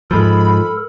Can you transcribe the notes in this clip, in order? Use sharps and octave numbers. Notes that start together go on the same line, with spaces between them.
G#2 F3 A4 A#4 B5